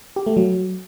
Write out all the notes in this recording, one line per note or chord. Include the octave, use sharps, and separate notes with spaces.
G4
A3
F#3